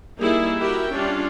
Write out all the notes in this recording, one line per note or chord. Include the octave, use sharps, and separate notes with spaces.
G3 A#3 D#4 E4 G#4
E4 F#4 G4 A#4 E5 G5
G3 C#4 D4 F4